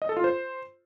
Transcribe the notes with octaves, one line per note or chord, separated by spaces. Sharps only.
D#5
A4
F4
C5